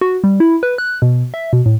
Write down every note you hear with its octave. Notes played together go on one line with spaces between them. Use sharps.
F#4
G3
E4
B4
F#6
B2
E5
B2
A2